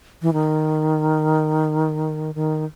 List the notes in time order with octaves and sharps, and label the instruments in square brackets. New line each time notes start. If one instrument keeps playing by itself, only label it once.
[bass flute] E3
D#3
D#3